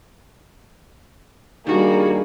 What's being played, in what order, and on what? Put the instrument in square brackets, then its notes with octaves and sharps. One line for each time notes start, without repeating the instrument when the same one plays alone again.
[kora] G2 D#3 [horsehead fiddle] G3 G#4 [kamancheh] A#3 [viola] F#4